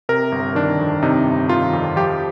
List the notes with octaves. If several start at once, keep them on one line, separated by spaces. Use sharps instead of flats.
C3 A#4
G1
D#3 D4
F2
C3 D#4
G1
D#3 F4
F2
F3 G4